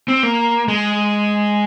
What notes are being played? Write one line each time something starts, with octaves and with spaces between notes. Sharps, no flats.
C4
A#3
G#3